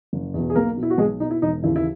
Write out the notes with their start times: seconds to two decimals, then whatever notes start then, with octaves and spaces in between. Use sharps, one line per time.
0.13 F#1
0.34 E2 B2
0.50 G#4
0.55 B1 A#3 A#4
0.77 B2
0.83 E4
0.90 F#4
0.98 B1 G#3 G#4
1.19 B2 D#4
1.31 E4
1.42 E1 D#4
1.62 D#2 C#3 E3 E4
1.76 E4